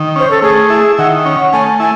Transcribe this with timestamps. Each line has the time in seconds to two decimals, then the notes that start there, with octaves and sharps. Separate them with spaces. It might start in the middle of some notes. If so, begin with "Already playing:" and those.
Already playing: D#3
0.16 C#4 C5
0.31 A4
0.42 A3 G#4
0.70 E4
0.98 D#3 F#5
1.25 C#4
1.53 A3 G#5
1.80 E4 G#5